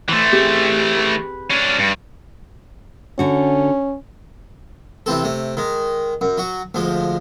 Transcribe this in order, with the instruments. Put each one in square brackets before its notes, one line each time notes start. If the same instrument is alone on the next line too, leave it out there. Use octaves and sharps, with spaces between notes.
[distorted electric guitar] E3 A3 [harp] C5 C6
[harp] C4 G4 G#4
B4
[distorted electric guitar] C#4 D4
G2
[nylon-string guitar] D3 F#4 [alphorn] C#4
[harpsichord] C3 E3 C4 A4
C3 A3
D#3 G#3
F#2
F#3 F#4
D2 F3 G#3